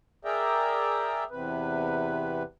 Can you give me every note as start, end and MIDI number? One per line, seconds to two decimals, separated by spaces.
0.25 1.24 68
0.25 1.24 70
0.25 1.24 74
0.25 1.24 76
0.25 1.24 79
0.25 1.24 82
1.31 2.43 40
1.31 2.43 48
1.31 2.43 71